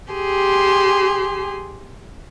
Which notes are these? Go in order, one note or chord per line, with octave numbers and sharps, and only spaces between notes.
G4 G#4 C6